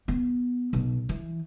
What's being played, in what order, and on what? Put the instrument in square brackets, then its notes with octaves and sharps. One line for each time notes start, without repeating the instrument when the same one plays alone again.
[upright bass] B3
B1
E3